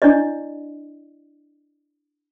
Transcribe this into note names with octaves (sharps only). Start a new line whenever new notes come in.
D4 E4 D5 D#5